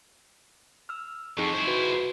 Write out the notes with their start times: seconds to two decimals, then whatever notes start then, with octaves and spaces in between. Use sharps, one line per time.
0.89 E6 F6
1.37 F2 D#4 G#4 C#6
1.53 E4 C5
1.67 F#4 B4